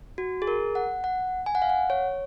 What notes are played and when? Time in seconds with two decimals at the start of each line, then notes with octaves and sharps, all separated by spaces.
0.18 F#4
0.42 G#4
0.47 A#4
0.75 F#5
1.04 F#5
1.46 G#5
1.55 F#5
1.62 F5
1.70 F#5
1.90 C#5